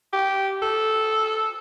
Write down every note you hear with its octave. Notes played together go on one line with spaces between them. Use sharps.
G4
A4